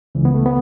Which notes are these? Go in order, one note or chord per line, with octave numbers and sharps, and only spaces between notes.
C#2 C#3 E3
B3
A3
B3